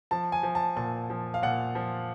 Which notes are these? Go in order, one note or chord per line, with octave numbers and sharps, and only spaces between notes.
F3 A5
G#5
F3
A5
A#2 A5
F3
F5
A#2 F#5
F3